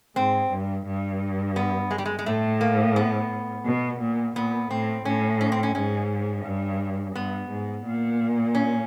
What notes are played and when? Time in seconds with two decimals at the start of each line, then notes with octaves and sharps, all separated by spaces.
0.16 G#2 C4
0.51 G2
0.86 G2
1.56 B3
1.91 G#3
1.98 G3
2.05 G#3
2.19 G#3
2.26 A2 A3
2.61 A#3
2.96 B3
3.66 B2
4.00 A#2
4.36 A#2 B3
4.71 A2 C4
5.05 A2 C#4
5.41 C#4
5.52 C4
5.63 C#4
5.75 G#2 C#4
6.45 G2
7.15 G2 B3
7.50 G#2
7.85 A#2
8.55 C#4